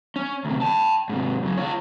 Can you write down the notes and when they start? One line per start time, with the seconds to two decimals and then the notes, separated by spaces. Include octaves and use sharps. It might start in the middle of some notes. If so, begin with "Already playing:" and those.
0.16 C#4
0.45 D2 C3
0.62 G5 A5
1.09 G#2 C3
1.43 F#2 C#3
1.58 F4 C#5